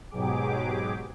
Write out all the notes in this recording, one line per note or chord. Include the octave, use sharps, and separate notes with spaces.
G#2 B2 F#3 G4 G#4 D6